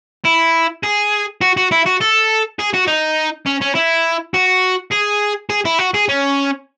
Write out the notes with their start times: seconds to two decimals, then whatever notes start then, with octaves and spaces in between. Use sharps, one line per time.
0.25 E4
0.83 G#4
1.41 F#4
1.57 F#4
1.71 E4
1.86 F#4
2.01 A4
2.59 G#4
2.74 F#4
2.87 D#4
3.46 C#4
3.61 C#4
3.75 E4
4.34 F#4
4.92 G#4
5.50 G#4
5.65 E4
5.79 F#4
5.94 G#4
6.09 C#4